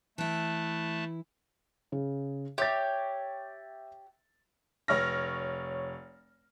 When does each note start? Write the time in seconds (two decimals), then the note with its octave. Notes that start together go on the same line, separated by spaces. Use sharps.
0.18 E3 A3 E4 A5 F#6
1.92 C#3
2.58 G4 C#5 E5 A6
4.88 F1 C#5 F6 A#6